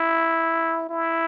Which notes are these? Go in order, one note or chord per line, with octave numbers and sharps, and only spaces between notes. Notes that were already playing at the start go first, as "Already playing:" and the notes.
Already playing: E4
E4